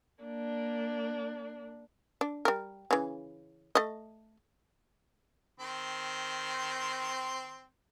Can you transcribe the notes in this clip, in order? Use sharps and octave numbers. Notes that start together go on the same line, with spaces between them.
A#3 D4
D4
G3 A#4
C#3 E3
A3 D#5
D#3 C4 C6